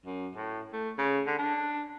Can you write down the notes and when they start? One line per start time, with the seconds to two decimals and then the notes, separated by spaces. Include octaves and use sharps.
0.06 F#2
0.36 A2
0.73 A3
0.98 C#3
1.27 D3
1.39 D4